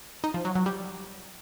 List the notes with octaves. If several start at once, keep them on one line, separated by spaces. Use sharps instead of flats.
D#4
F3
F#3
F#3
G3